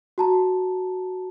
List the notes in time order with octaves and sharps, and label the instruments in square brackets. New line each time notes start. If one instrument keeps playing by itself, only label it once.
[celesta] F#4 A5 A#5